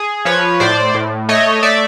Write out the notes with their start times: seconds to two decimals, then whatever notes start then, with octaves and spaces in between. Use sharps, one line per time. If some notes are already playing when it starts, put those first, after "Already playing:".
Already playing: G#4
0.25 F3 B4 C#5
0.60 A2 C5 D5
0.94 A2
1.29 A3 C#5 D#5
1.63 A3 D5 E5